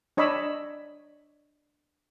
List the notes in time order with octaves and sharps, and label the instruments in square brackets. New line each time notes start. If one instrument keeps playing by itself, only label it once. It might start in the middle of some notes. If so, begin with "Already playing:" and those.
[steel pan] D4 C#5 D#5 B5 D6 E6